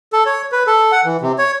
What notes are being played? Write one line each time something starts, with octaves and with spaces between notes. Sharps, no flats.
A4
C#5
B4
A4
F#5
E3
C3
C#5